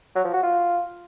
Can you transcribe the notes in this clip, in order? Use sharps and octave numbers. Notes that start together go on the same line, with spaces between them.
F#3
F3
F#4
F4